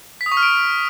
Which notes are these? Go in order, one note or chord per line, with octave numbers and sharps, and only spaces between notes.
B6
D#6
C#6
F6
D7